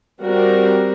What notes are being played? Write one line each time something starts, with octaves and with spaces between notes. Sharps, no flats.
G3 C4 F#4 A#4